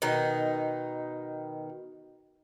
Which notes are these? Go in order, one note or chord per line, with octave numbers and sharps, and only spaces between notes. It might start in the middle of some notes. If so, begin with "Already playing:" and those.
B2 D#3 D#4